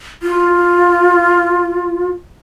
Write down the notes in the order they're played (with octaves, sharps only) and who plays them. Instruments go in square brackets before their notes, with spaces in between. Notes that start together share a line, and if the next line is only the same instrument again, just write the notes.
[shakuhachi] F4